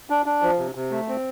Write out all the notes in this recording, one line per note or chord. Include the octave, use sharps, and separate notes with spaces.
D4
D4
F3
C3
C3
A3
C4